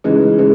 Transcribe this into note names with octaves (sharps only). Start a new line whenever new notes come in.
C#3 E3 G#3 D#4
C#3 E3 G#3